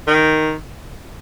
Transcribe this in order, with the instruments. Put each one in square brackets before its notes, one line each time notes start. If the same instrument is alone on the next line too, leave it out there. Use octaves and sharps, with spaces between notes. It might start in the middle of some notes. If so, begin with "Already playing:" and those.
[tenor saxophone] D#3